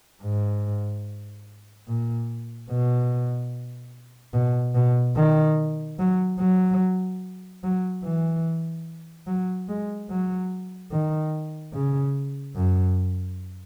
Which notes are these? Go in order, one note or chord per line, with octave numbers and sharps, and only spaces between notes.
G#2
A#2
B2
B2
B2
D#3
F#3
F#3
F#3
E3
F#3
G#3
F#3
D#3
C#3
F#2